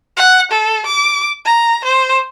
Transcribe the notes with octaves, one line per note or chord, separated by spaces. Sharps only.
F#5
A4
D6
A#5
C5